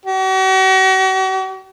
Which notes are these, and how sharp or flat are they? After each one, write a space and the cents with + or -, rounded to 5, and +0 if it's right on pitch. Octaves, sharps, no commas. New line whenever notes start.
F#4 +45